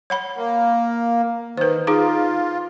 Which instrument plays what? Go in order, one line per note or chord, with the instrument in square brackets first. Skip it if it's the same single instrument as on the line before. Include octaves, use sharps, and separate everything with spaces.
[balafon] C#5 F#5 B5
[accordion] A#3
[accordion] D#3 [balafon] B4 C5
[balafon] D#4 G#4 D6 [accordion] F4